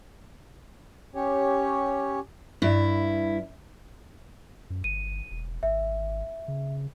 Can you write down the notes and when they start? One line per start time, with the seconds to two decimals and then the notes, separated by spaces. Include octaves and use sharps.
1.15 C#4 G4 C#5
2.62 G2 E4
4.70 F#2
4.84 G1 D#7
5.31 E1
5.63 G#1 E5
6.48 C#3